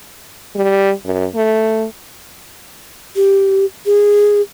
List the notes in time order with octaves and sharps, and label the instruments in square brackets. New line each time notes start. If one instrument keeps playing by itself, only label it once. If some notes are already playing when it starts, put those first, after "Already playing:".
[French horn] G3
F#2
A3
[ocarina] G4
G#4